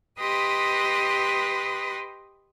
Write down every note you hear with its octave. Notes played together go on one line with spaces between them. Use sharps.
G4 B4 D#5 C6 D#6